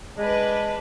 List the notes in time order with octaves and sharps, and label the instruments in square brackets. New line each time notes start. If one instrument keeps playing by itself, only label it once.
[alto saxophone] G#3 [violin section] D4 B4